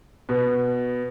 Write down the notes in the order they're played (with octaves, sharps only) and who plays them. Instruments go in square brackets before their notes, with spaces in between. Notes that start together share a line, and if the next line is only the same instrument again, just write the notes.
[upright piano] B2